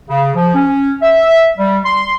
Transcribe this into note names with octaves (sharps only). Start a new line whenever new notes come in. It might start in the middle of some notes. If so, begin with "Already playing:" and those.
C#3
F3
C#4
E5
G3
C6